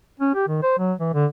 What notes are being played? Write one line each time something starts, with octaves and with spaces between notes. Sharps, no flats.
C#4
G4
D#3
C5
F#3
E3
D3